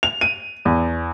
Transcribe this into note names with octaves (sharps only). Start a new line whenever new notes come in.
F7
D#7
E2